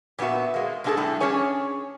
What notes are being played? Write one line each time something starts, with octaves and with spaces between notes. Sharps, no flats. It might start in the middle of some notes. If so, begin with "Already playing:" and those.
A#2 B3 C#4 F#4 E5
G#3 A#3
C3 G#3 D4 E4 G#4 A4
A2 G3 A3
C#4 D4 G#4 C#5 G#5